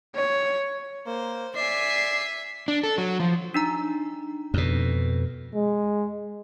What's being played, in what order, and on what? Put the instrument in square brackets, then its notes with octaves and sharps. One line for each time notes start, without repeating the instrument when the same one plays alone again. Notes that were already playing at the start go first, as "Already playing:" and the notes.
[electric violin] C#5
[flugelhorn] A#3 [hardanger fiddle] C5
[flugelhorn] D5 [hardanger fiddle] E5 G#5 [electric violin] C7
[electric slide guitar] D4
A4
F#3
F3
[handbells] D4 D#4 A#5
[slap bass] F2 B2
[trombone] G#3